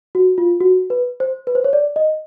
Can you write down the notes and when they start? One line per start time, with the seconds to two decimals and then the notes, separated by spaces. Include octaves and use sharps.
0.15 F#4
0.38 F4
0.61 F#4
0.90 B4
1.20 C5
1.47 B4
1.55 C5
1.64 C#5
1.73 D5
1.96 D#5